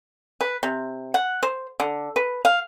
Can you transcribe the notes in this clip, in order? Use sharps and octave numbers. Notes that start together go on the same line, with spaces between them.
B4
C3
F#5
C5
D3
B4
F5